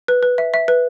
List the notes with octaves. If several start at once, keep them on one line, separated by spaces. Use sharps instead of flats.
B4
B4
E5
E5
B4